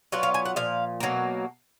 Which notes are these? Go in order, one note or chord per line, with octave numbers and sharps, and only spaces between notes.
F#3 B3 F4 F#5
F5
G#5
F#5
A#2 F3 F5
B2 F#3 A#3